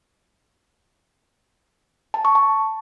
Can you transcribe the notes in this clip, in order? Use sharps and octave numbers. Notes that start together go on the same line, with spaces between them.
A5
C#6
A5